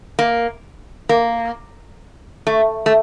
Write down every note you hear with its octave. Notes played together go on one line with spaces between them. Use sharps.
A#3
A#3
A3
A3